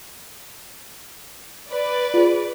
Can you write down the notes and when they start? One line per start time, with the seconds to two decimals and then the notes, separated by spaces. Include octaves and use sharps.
1.70 B4 D5
2.14 F4 G#4